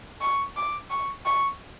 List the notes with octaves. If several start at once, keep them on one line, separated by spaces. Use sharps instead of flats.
C#6
D6
C#6
C#6